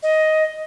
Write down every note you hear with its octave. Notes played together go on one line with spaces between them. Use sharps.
D#5